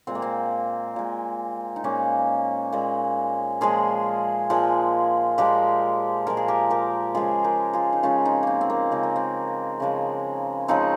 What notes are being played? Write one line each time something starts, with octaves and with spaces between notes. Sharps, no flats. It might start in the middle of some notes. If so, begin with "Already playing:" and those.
A#2 G#3 C4
A#3
C4
A#2 G#3
D#4
A#2 G#3 A#3 C#4
A#2 G#3
A#2 F3 G#3 F4 G#4
A#2 F3 G#3
A#2 F3 G#3 G4 A#4
A#2 F3 G#3 A#4
G#4
G4 A#4
G4 A#4
C#3 F3 G#3 F4 G#4
G4 A#4
F4 G#4
D#4
C#3 F3 G#3 C#4 F4
C4 D#4
A#3 C4
C4
A#3
C#3 F3 G#3 C4
A#3
C4
C#3 F3 G#3
C#3 F3 G#3 C4 D#4